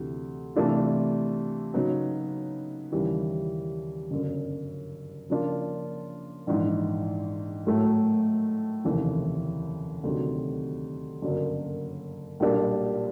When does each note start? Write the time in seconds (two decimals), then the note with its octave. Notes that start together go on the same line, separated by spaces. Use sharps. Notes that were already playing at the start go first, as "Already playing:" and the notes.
Already playing: D2 C3 E3
0.56 C3 E3 A3 D4 F4
1.74 C#3 F#3 B3 D#4
2.92 D#2 C#3 E3 G3
4.11 G1 F#2 C#3
5.30 C#3 F3 A#3 D4 F4
6.47 A#1 G#2 E3
7.67 A2 F#3 A3
8.84 F1 D#2 C#3 E3
10.03 D2 C3 D#3 F#3
11.22 G1 F#2 C#3 F#3 A#3
12.40 B1 A#2 G3 A#3 D4